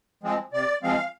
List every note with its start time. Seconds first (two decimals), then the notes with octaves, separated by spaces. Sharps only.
0.23 F3 G#3 C4
0.53 C3 D5
0.83 F3 G#3 C4 F5